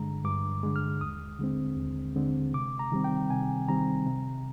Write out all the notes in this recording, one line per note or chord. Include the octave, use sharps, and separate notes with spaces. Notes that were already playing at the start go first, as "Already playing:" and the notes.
Already playing: G2 D3 G#3 A#5
G2 D6
D3 G#3
F6
D#2 D#6
D3 G#3 C4
D#2
D3 G#3 C4
C3 D6
A#5
D#3 G3 C4
G5
C3 G#5
D#3 G3 C4 A#5
C3